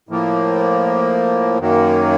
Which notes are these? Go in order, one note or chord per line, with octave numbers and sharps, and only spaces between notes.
A2 F3 A#3
F#2 D#3 F#3 A#3